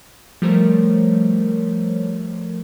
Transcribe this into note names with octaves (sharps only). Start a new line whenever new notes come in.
F3 G3 A3 A#4 C5 C#5